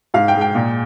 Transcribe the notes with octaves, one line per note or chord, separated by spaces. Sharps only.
G#2 F5
G5
G#3
G5
A#2